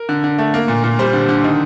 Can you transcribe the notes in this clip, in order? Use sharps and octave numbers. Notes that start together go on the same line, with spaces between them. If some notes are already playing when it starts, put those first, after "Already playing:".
Already playing: A#4
D3
D3
A3
A#3
A#2
A#2
G3 C5
D3
D3
D#3